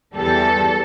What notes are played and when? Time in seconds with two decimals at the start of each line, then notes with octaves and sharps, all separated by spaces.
0.15 E2 E3 G3 A4